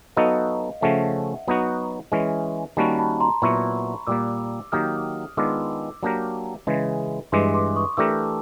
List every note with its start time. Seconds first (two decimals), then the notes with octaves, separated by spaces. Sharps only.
0.17 F#3 B3 D#4 F#4 A4 D#5 F5
0.81 C#3 F3 A3 C#4 E5 F#5
1.48 F#3 B3 D#4 F#4
2.12 E3 G#3 C#4
2.77 D#3 G3 A#3 C#4 F#4 A5 B5
2.99 A5 B5
3.20 A#5 C6
3.42 A#2 F#3 B3 E4 B5 C#6
4.07 A#2 G3 A#3 D6 E6
4.72 D#3 F#3 A#3 D#4 G4 D#6 F6
5.37 D#3 G#3 B3 D4 F4 D6 E6
6.03 F#3 A#3 D4 G4 A#4
6.67 C#3 E3 G#3
7.32 G2 E3 G#3 C6 D6
7.54 C6 D6
7.76 C#6 D#6
7.97 E3 A3 D4 G4 A#4 D6 E6